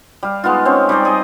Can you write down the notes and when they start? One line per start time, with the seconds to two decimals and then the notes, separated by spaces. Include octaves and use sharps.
0.23 G3 F5
0.44 G#3 B3 D#4 F4
0.65 C4 C#4 C5 C#5
0.89 G3 D#4 C5 D5
1.05 G#4 D#5